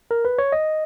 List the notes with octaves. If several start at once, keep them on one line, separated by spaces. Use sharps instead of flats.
A#4
B4
C#5
D#5